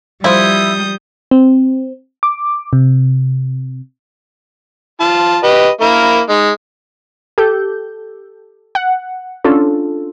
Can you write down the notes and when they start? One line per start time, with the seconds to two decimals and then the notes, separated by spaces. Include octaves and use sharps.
0.24 F3 G3 E4 E5 D#6 G6
1.31 C4
2.23 D6
2.73 C3
5.00 F4 A5
5.43 G4 B4 D#5
5.81 A#3 E4 A#4
6.29 G#3 D#4
7.38 G4 A4 G6
8.75 F#5
9.45 C#4 D4 F4 A4